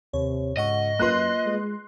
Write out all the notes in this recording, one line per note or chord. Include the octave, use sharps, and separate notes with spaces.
D#2 C3 C#5
C#2 G#2 D#5 F#5 C#6
F#2 A#3 F4 B4 C6 F#6
G#3